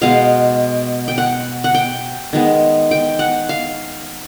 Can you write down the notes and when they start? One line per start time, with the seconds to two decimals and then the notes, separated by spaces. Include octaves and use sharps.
0.01 B2 G#3 B3 F5
1.08 G5
1.18 F#5
1.64 F#5
1.74 G5
2.33 D#3 G#3 B3
2.91 G5
3.19 F#5
3.49 F5